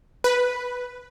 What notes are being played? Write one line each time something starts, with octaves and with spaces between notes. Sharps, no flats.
B4